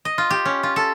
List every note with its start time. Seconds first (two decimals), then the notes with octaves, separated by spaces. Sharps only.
0.05 D#5
0.18 F4
0.31 G4
0.45 C#4
0.63 F4
0.76 A4